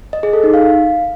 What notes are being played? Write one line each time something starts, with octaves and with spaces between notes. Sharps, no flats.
D#5
G#4
A4
D#4
F5